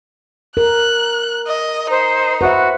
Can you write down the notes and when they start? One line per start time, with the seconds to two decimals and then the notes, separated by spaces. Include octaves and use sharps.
0.57 A#4 F#6
1.47 D#5
1.90 D#4 C5
2.41 F#4 B4 C5 E5